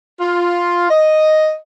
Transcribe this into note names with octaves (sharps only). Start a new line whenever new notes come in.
F4
D#5